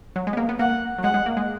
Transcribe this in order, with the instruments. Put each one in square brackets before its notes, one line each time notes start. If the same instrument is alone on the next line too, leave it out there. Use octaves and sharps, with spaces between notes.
[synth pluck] F#3
G#3
B3
A#3
B3
[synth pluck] A#3 [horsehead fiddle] F#5
[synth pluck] F#3
[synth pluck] G#3 [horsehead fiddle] F#5
[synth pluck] G#3
A#3
G#3